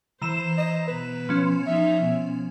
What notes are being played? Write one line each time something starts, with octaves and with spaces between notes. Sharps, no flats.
E3 C5 A#5 E7
D#5
B2 B4
F3 C#4
D#4 E5
B2